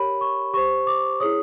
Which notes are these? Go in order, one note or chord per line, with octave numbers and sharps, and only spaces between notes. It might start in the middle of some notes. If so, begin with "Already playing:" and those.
Already playing: G4 A#4 C#5 B5
C#6
G4 C5 C#6
D6
E4 G#4 C#5 D#6